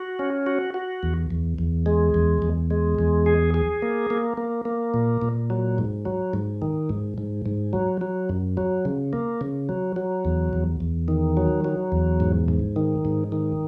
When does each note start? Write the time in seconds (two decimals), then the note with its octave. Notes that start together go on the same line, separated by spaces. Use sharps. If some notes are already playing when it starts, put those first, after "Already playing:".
Already playing: F#4
0.19 C#4
0.46 F#4
0.74 F#4
1.03 E2
1.30 E2
1.58 E2
1.86 G#3
2.14 E2
2.42 E2
2.71 G#3
2.99 E2
3.26 G#4
3.54 G#4
3.82 A#3
4.10 A#3
4.37 A#3
4.65 A#3
4.94 A#2
5.22 A#2
5.50 F#3
5.78 G#2
6.05 F#3
6.33 G#2
6.62 D#3
6.90 G#2
7.18 G#2
7.46 G#2
7.73 F#3
8.01 F#3
8.29 F#2
8.57 F#3
8.85 C#3
9.13 A#3
9.41 C#3
9.69 F#3
9.96 F#3
10.25 E2
10.53 E2
10.80 E2
11.08 D#3
11.37 F#3
11.65 F#3
11.92 E2
12.20 G#2
12.48 G#2
12.76 D#3
13.05 G#2
13.32 D#3